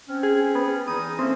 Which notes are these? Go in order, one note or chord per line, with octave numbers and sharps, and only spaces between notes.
C4 C#4
G#4
B3
E2 E3 D#4 D#6
A3 A#3 C4 C#4